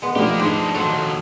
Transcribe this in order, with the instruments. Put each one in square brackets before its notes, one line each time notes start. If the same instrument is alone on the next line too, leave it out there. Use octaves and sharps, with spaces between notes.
[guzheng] G#3 B3
[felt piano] F3 A3 D5 [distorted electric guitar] A#3 G4
[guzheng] G#2 [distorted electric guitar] G#3 D4
[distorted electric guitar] D#2 F#3 [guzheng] A4 C5